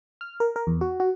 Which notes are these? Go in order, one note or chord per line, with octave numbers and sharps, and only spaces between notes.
F6
A#4
A#4
E2
F#4
F#4